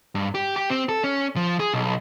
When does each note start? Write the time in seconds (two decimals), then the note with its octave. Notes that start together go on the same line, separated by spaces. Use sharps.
0.15 G2
0.35 G4
0.56 G4
0.70 C4
0.89 A4
1.04 C#4
1.36 F3
1.60 G#4
1.73 B1